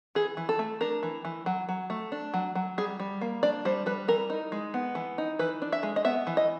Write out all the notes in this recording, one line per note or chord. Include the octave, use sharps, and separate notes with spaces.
E3 G#4
E3
A4
A3
D4 A#4
E3
E3
F#3
F#3
A3
D4
F#3
F#3
G3 G#4
G3
A#3
D4 D5
G3 C5
G3 B4
E3 A#4
D#4
G#3
B3
E3
D#4
E3 B4
D4
E5
G#3
D#5
B3 E5
E3
D#5